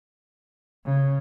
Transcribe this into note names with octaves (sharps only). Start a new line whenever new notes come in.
C#3